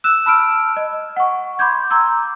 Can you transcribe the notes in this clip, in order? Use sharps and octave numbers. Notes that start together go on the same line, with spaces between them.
E6 F#6 E7
A5 B5 E6 F6 D7
D#5
F#5 C#6
B5 C6 D6 G6 G#6
A#5 C6 D6 E6 G6